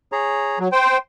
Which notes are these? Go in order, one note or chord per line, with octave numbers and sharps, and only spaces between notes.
G#4 C#5 A#5
F#3
C5 G5 C6